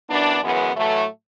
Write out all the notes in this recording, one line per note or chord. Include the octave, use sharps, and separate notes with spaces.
F#2 E3 B3 D4
F#2 C#3 E3 G#3 B3
A2 E3 F#3 A3